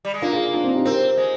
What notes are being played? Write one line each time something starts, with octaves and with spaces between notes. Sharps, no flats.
G3
G#3
A#3 D4 F4
F4 G#4
D4 F4
C4 D#4
D#4 G4
C4 G4 A#4
G#3